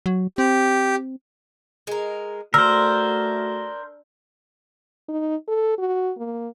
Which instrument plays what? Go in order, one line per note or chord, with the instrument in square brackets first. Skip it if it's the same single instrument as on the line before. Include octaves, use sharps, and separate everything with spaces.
[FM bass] F#3
[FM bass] C4 [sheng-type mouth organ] G4
[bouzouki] G#3 A#4
[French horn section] A3 F#4 [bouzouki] D4 [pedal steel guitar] A#4 C5 [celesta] E6 F6
[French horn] D#4
A4
F#4
A#3